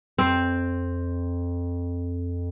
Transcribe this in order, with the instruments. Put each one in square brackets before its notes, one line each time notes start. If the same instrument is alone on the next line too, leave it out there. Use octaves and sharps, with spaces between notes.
[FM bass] F2 [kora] C4 C5